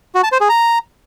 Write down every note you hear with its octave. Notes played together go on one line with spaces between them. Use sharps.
F#4
A5
C5
G#4
A#5